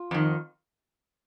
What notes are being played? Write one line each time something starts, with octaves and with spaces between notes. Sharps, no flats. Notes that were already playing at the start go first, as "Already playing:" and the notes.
Already playing: F4
F2 D#3